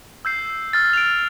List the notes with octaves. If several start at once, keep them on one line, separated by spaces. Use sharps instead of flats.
E6 G6 C7
E6 F6 A6
D7 F7